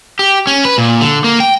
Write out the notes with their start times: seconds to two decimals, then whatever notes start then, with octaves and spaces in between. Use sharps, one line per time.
0.19 G4
0.47 C#4
0.65 B4
0.78 A#2
1.01 D3
1.24 A#3
1.40 G5